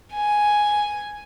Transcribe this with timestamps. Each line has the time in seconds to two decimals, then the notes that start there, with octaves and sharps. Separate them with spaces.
0.13 G#5